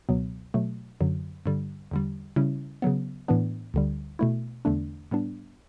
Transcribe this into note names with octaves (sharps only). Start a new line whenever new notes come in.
C#2 B2 F#3 B3
B2 F#3 A3
F#2 D3 F#3
G2 D3 G3
E2 D3 G3
C#3 G3 C#4 E4
C#3 F#3 B3
A2 E3 B3 D4
D2 D3 G3
B2 A3 E4
E2 D3 A3 D4
A2 G3 B3 D4